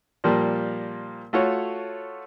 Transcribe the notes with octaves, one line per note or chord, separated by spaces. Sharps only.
A#2 F3 G3 A#3
A3 F4 F#4 C#5